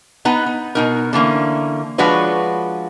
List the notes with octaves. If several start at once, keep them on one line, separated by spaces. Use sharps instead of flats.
B3 D#4 B4 A#5
D#4
B2 D#4 A#4
D3 E3 A#3 C#4
F3 G#3 D4 F#4 B4 C#5